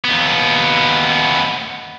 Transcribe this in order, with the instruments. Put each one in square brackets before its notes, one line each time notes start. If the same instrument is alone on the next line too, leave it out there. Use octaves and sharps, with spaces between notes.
[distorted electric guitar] D#2 B3